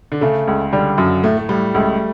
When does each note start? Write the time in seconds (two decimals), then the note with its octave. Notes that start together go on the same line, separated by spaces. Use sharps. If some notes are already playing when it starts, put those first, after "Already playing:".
0.12 D3
0.21 C#3 A3
0.47 C#2
0.73 D3 G3
0.97 F#2 F#3
1.24 A2 A3
1.38 A3
1.49 A2 G3
1.74 C#2 A3